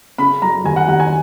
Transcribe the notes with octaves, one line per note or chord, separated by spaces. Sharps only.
C#3 B5
F#3 A#5
D#2 G#5
F#5
D#2 F#5
G#5